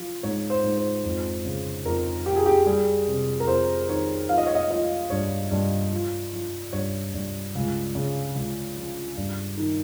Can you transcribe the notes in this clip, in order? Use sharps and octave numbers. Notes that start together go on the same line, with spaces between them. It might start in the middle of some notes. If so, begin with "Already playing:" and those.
Already playing: F3
G#2 C#5
C5
G#2
C5
F2
C#3
F2 A#4
F3 G4
G#4
G4
G3 G#4
C3
A#4
F2 C5
D#3 C#5
F3 F5
D#5
C#5
D#5
F3 D#5
G2 C#5
G2
F3
F3
G2 C#5
G2
C#2
C#3
C#2
F3
G2
D#3